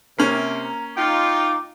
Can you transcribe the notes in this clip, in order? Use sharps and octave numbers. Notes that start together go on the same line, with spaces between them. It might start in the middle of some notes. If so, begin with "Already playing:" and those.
C3 A#3 C#4
A#5
D#4 F4 G5 D6